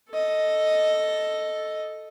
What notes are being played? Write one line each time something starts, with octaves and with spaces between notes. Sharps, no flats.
A4 D#5